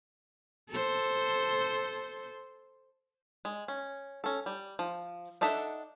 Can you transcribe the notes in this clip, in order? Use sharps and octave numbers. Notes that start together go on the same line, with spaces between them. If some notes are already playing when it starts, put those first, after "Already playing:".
A4 C5
G#3
C#4
C#4 A4
G3
F3
D4 D#4 A4 E5 F#5